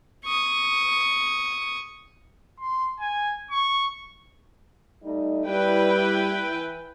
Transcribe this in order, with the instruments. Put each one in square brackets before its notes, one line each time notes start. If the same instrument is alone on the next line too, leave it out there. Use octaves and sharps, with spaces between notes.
[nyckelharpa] C#6 D#6
[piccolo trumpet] C6
G#5
C#6
[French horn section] G3 A3 D#4
[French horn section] G3 [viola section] E4 B4 G5
[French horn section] E3